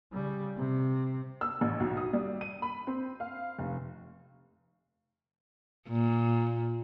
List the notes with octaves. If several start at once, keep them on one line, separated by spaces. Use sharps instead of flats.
C#3 G3
C3
E6
A1
B1
D#6
G3
D#7
B5
C4
F5
F1
A#2